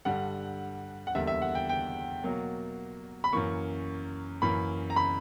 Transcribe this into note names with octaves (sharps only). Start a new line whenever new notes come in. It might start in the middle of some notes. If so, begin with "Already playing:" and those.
G2 D3 G3 F#5
F#5
E2 D3 G3 A#3 E5
E5
F#5
G5
G5
B2 F#3 A#3
B5
F#2 E3 A#3 C#6
F#2 E3 A#3 B5
A#5
B5